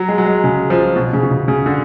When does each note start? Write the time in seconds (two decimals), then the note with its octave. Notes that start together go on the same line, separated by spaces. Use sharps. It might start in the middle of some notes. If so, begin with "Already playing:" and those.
Already playing: F#3
0.08 G#3
0.18 F#3
0.26 G#3
0.44 C#3
0.70 F3
0.96 B2
1.13 C#3
1.23 B2
1.31 C#3
1.48 C#3
1.66 D3